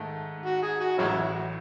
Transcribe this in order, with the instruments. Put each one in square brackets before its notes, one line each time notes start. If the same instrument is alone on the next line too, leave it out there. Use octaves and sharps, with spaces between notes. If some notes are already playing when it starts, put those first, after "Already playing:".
Already playing: [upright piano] G#2 D#3 A3
[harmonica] F#4
G#4
F#4
[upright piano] A1 A2 F#3 [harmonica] G#3 C#4 E4
[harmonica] F#4